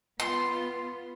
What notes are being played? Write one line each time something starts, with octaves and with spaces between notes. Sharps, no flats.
B3 F4 C6